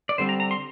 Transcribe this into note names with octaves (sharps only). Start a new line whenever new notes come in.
D5
D3 G3 C4 C5
A#5
A#5
C6